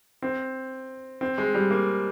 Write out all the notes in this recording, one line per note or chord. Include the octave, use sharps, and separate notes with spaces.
C4
C4
G#3
G3
A#3